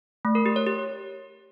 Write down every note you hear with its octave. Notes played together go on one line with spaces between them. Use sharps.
A3
A#4
G4
C#5
G4